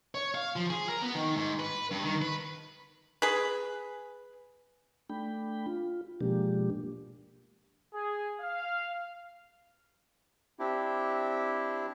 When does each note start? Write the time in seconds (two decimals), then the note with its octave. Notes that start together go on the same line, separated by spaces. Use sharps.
0.15 C#5
0.35 F5
0.56 F3
0.70 G#4
0.89 A#4
1.02 B3
1.15 D#3
1.36 G#2
1.60 B4
1.91 G2
2.04 D#3
2.22 B4
3.22 G#4 B4
5.10 A3 D4 G5 B5
5.67 F4
6.21 B2 F3 G#3 A#3 D4 G4
7.94 G#4
8.41 F5
10.59 C4 D4 E4 G4